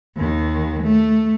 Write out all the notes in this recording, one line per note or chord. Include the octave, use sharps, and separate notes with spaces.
D#2 D#3
A3